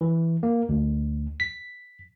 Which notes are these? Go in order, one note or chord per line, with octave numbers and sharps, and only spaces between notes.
E3
A#3
D2
B6